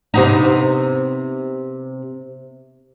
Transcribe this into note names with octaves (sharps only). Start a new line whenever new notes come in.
C3 B3 D#4